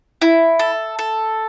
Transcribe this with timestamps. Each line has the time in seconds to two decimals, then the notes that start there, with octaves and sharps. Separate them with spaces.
0.22 E4
0.59 A4
0.99 A4